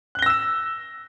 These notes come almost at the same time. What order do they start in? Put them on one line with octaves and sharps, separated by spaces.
F#6 G7 A#6 E6 E7